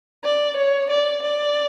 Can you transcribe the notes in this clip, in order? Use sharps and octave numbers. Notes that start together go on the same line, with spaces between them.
D5
C#5
D5
D5